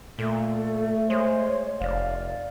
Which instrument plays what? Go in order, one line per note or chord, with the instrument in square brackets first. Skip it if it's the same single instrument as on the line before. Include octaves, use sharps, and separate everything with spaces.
[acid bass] A#2 [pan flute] A3 [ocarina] A4
[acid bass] G#3 [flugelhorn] C5 [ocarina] C#5
[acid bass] F1 [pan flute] D5 [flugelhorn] F5